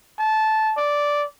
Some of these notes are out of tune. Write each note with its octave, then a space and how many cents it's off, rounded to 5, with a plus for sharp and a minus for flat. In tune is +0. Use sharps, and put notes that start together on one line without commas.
A5 -15
D5 -5